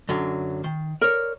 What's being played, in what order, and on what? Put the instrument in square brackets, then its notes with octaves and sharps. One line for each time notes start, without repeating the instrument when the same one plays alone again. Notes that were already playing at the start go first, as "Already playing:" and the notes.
[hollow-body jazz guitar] F#2 D3 F#3
D#3
[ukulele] A#4 [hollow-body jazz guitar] C#5 D5